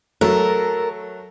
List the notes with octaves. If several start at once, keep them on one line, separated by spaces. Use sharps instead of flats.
F#3 A3 A4 A#4